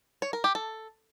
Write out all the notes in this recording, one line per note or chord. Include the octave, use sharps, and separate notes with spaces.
C#5
A#4
G4
A4